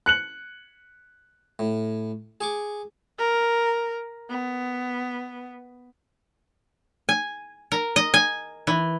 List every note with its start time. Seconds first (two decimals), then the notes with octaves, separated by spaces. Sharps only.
0.06 F#6 C#7 F#7
1.59 A2
2.41 G#4 C#6 D6
3.19 A#4
4.30 B3
7.09 G#5
7.72 A#4
7.96 D#5
8.14 G#5
8.67 E3